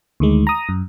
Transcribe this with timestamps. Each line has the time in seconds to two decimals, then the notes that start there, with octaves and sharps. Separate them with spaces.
0.20 D2 D#3 G#3
0.47 A#5 D#6
0.69 F#2